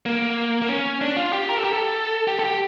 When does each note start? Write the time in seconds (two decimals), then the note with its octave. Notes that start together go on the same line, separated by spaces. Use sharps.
0.06 A#3
0.62 A#3
0.69 C#4
1.01 D4
1.16 F4
1.33 G4
1.49 A#4
1.57 A4
1.64 G4
1.73 A4
2.28 G4
2.39 A4
2.44 G4